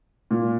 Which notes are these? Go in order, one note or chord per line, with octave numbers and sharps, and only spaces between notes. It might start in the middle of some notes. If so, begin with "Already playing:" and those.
A#2